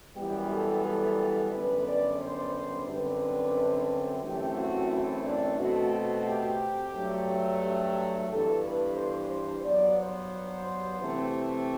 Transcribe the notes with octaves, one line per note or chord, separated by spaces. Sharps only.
F#2 E3 G3 B3 G4
A4
A4
F#2 D3 G3 B3 B4
D5
C5
F#2 D3 G3 C4 B4
F#2 E3 A3 C4 G4
F#4
E4
D4
B2 A3 C4 F#4
F#4
G4
G2 F#3 A3
G4
G2 E3 B3 A4
B4
C5
C5
G2 F#3 B3 D5
C5
C3 E3 A3 C4